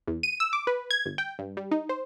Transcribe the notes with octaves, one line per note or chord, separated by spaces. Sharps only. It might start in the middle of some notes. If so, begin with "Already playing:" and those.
E2
D#7
E6
D6
B4
G#6
G1
G5
G2
G3
D#4
C5